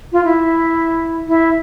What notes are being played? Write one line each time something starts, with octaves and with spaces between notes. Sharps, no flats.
F4
E4
E4